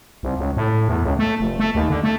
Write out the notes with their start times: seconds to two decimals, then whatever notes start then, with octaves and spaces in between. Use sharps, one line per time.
0.23 C2
0.39 C#2
0.57 A2
0.88 E2
1.04 C#2
1.19 A3
1.40 F1
1.59 A3
1.75 D#2
1.90 D3
2.04 A3